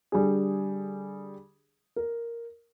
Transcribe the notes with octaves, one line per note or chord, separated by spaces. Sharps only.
D3 G3 D4 G#4
A#4